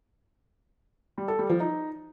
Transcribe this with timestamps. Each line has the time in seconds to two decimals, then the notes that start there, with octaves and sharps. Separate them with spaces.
1.18 G3
1.28 A4
1.39 G3
1.49 F3
1.60 D#4